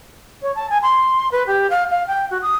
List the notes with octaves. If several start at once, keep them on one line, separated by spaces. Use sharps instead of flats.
C#5
A5
G#5
C6
B4
G4
F5
F5
G5
F#4
D#6